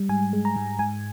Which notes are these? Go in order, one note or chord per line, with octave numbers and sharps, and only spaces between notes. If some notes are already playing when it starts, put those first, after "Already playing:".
Already playing: G3
G#2 G#5
G#3
A#5
G#2
G#2 G#5